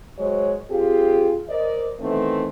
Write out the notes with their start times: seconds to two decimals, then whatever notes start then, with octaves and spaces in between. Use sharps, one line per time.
0.17 F#3 G#3 C5 C#5
0.70 C4 F4 G4 G#4
1.49 A#4 C5 D5 D#5
2.00 D#3 E3 A3 B3 C4